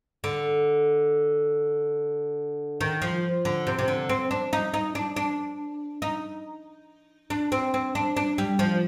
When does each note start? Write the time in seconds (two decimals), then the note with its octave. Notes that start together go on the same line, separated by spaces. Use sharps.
0.24 D3
2.81 D#3
3.02 F3
3.45 D3
3.67 C3
3.79 C3
3.88 D3
4.09 C4
4.31 D4
4.53 D#4
4.74 D#4
4.95 D4
5.16 D4
6.02 D#4
7.30 D4
7.52 C4
7.74 C4
7.95 D4
8.17 D4
8.38 G3
8.59 F3